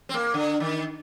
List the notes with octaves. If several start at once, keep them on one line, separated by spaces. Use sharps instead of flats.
C4
A#3
D3
D#3